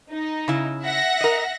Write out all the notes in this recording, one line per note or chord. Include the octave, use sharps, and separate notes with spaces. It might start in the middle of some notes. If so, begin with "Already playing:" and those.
D#4
C#3 E4
E5 F#5 A#6
A#4 D#5